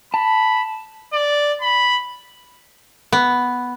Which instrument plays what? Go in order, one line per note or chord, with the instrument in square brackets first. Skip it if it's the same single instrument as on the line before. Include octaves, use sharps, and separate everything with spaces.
[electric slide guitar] A5 [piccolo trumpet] B5
[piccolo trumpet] D5
B5
[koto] B3